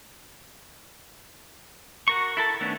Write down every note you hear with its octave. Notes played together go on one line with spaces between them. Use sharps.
F#4 A#4 C#6
E4 A4 A5
D#3 A3 B3 C#4 D4